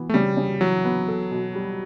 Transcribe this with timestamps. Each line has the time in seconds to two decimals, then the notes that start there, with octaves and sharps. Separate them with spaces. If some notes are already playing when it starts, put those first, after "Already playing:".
Already playing: E3 B3
0.09 A3
0.14 C#3 G3
0.37 C#3
0.61 E3 F#3
0.84 B3
1.08 A4
1.31 B2
1.55 G3